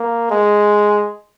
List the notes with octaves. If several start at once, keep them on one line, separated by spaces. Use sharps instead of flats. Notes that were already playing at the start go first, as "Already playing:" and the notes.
Already playing: A#3
G#3